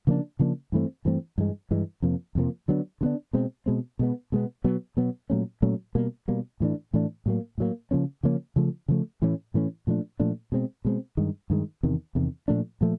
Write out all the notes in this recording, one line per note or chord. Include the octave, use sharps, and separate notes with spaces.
C#3 F3 A#3 D4
C#3 F3 A#3 D4
G2 E3 A3 C4
G2 E3 A3 C4
G2 E3 G#3
G2 E3 G#3
F2 C3 F3 A#3
F2 C3 F3 A#3
D3 F#3 B3 D4
D3 F#3 B3 D4
B2 G#3 C4
B2 G#3 C4
B2 G#3 B3
B2 G#3 B3
B2 F#3 B3
B2 F#3 B3
A#2 F#3 A3 C#4
A#2 F#3 A3 C#4
B2 G3 A#3
B2 G3 A#3
A2 E3 A3 D4
A2 E3 A3 D4
A2 F#3 A#3
A2 F#3 A#3
C#3 F3 A#3 C#4
C#3 F3 A#3 C#4
C#3 F3 A3
C#3 F3 A3
A2 E3 A3 C#4
A2 E3 A3 C#4
A#2 F3 A3 D4
A#2 F3 A3 D4
B2 G#3 C4
B2 G#3 C4
G2 D#3 G#3
G2 D#3 G#3
E2 C3 D#3
E2 C3 D#3
A#2 F3 A3 D4
A#2 F3 A3